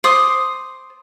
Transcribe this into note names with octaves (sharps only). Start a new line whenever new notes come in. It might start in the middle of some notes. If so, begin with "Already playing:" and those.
C5 D6 D#6